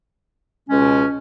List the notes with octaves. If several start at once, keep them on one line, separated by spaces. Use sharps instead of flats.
C#2 B2 G#3 C#4